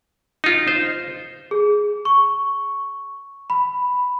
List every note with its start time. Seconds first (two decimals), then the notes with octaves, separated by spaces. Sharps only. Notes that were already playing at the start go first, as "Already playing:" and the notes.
0.44 D#4 F4
0.68 C5
1.51 G#4
2.05 C#6
3.50 B5